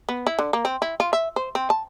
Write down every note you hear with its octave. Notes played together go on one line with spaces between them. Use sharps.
B3
E4
D3
A#3
C4
E4
F4
E5
C5
C4
A5